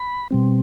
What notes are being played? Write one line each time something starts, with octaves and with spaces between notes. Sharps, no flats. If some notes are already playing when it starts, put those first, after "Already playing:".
Already playing: B5
B2 G3 C4